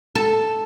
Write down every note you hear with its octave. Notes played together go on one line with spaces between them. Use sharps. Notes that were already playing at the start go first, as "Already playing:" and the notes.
A4